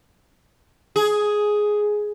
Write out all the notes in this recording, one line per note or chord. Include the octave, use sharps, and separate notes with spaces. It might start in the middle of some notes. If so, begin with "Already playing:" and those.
G#4